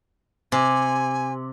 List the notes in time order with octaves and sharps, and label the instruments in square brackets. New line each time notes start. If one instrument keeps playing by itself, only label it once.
[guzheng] C3 [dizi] G#5